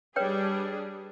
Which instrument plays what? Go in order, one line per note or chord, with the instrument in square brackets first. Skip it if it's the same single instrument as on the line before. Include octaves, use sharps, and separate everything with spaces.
[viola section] G3 D4 G#4 [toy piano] B4 C#5 G5